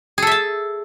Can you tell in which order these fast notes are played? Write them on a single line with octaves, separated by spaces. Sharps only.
G#4 A4 E5 A5